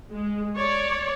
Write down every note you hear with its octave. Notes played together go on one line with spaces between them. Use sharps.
G#3
C#5 D5